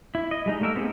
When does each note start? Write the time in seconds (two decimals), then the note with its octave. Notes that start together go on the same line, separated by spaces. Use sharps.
0.15 E4
0.31 D#5
0.46 G3 G#3 D#4
0.61 A3 A#3 A#4 E5 E6
0.76 B3 C4 D#4 G4 G#4